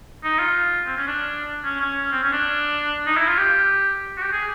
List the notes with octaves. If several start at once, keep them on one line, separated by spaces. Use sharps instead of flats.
D#4
F4
C4
C#4
D4
C#4
C#4
C4
C#4
D4
D#4
E4
F4
G4
F#4
G4
G#4